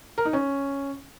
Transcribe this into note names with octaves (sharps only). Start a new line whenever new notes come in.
A#4
D#4
C#4